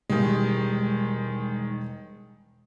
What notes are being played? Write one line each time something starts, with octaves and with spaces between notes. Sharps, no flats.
E1 D#3 G3 G#3